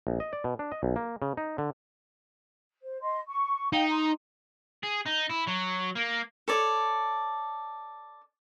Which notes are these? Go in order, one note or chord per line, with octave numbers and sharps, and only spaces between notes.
A#1
D#5
D5
B2
D4
D#5
B1
A#3
C#3
D#4
D3
C5
D#5 C6
C#6
D#4 F5 G5
A#5 C6
G#4
D#4
E4
F#3
A#3
A4 C#5 D5